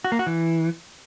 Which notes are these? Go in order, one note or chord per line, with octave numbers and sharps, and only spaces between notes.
F#4
A#3
F#4
E3